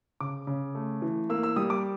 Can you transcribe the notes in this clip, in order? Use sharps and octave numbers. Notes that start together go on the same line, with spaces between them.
C#3 D6
C#3
A3
E3
A#3 E6
E6
G3 D#6
D6